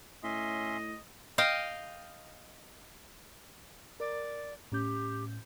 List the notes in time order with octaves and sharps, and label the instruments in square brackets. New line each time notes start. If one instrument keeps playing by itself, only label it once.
[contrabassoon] A2 [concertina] C#4 E5 C6 [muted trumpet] D#5
[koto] D#5 F5 G5
[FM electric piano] A#4 [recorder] D5
[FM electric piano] A2 C#4 G6 [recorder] G4